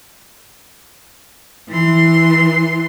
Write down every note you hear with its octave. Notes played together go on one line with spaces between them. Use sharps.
E3 C6